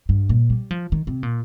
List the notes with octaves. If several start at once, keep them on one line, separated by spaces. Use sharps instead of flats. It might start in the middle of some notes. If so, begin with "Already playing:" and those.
G2
A#2
G3
F3
D#3
C3
A#2